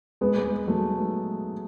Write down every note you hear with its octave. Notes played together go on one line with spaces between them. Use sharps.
G#3 B3
G#3 B3
F#3 A3